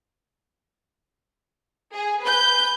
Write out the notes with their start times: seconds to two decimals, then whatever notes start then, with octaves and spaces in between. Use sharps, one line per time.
1.94 G#4
2.24 B4 G6